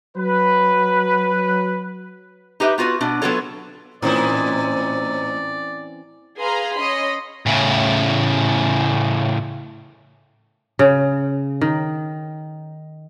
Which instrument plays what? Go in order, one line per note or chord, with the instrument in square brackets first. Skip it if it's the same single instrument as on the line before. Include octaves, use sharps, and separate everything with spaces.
[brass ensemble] F#3 B4
[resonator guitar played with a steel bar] D#4 G4 B4 E5
B3 F4 F#4 B4
B2 D4
F#3 B3 F4 F#4 A4 C#5
[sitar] A2 D#4 E4 [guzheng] E3 C4 C#4 [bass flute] C5 [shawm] D5
[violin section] G#4 B4 F5 A#5 C6
C#4 C#5 D#5 B5 C6
[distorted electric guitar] A2 C#3
[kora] C#3
D#3